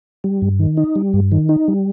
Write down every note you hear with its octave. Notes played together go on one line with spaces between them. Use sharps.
G3
G2
D#3
D#4
G3
G2
D#3
D#4
G3